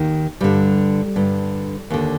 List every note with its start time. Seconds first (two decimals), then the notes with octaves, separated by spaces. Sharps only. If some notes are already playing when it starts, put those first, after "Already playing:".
Already playing: D#2 D#3
0.41 G2 D3 G3
1.16 G2 D3
1.90 D#2 D3